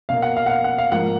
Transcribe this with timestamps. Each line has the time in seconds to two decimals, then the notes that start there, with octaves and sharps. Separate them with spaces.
0.09 B2 A#3 F5
0.22 F#5
0.37 F5
0.46 F#5
0.50 F5
0.64 F#5
0.78 F5
0.92 G#2 F3 A#3 F#5